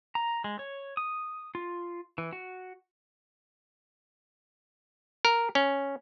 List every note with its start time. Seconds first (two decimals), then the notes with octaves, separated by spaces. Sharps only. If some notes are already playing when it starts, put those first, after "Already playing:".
0.15 A#5
0.44 G#3
0.59 C#5
0.97 D#6
1.55 F4
2.18 E3
2.33 F#4
5.25 A#4
5.55 C#4